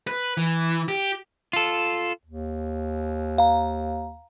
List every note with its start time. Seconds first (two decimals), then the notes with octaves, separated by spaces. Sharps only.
0.07 B4
0.37 E3
0.88 G4
1.53 F4 A4
2.25 D#2
3.38 F5 A#5